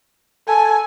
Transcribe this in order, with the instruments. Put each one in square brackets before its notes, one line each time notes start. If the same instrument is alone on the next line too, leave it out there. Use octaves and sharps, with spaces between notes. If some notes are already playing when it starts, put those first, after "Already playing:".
[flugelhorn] A4 [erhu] G#5